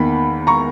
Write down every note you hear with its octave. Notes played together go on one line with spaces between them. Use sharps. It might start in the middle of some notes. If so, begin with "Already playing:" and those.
Already playing: E2 D#3 A#3 B5
A#5 C#6